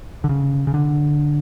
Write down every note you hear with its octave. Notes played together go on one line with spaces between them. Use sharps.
D3
C#3
C#3
D3